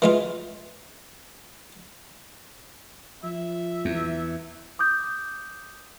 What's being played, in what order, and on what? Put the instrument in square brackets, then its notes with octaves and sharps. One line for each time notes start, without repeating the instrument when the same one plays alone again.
[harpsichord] E3 G#3 F4
[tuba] F3 [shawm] E5
[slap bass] E2
[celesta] D6 D#6 G6